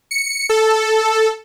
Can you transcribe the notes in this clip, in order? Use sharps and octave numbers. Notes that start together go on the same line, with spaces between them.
C#7
A4